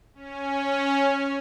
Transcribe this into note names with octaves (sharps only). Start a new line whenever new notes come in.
C#4